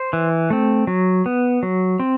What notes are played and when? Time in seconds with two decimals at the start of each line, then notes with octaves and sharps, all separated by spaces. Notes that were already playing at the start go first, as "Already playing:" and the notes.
Already playing: C5
0.13 E3
0.50 A3 C4
0.87 F#3
1.26 B3
1.63 F#3
1.99 C4